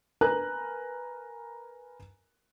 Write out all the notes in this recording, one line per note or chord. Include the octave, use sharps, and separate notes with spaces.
A#4 B4 G#5 A#5 F#6